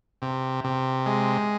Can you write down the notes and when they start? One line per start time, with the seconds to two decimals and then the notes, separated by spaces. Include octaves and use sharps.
0.22 C3
0.64 C3
1.06 G#3